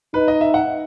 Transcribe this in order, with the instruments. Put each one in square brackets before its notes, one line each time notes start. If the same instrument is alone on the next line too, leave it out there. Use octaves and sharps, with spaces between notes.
[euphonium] D#4 [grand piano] B4
[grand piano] D#5
E5
F#5